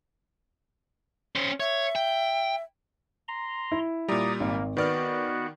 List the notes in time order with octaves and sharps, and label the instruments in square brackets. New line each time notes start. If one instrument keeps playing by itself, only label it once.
[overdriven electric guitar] C#4 C5
[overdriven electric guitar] C#5 [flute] E5
[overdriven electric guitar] G5
[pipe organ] A#5 C6
[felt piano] E4
[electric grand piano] A#2 G3 [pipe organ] D5 A#5 D#6
[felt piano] G#1 [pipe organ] A#3
[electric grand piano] D#3 D5 F6 [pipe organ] B3 F#4 [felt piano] B4